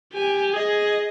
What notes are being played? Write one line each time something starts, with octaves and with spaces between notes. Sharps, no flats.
G4 G#5
G#4 D#5